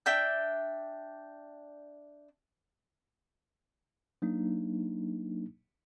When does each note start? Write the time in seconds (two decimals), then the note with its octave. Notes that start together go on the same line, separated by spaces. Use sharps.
0.06 D4 E5 G5 G6
4.22 F#3 A#3 D4 D#4